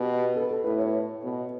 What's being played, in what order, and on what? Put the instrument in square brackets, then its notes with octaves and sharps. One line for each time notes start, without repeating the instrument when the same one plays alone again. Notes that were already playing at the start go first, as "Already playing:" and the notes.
Already playing: [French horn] B2 [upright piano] G4
[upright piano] A4
B4
A4
[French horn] A2 [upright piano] B4
[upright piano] C#5
[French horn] B2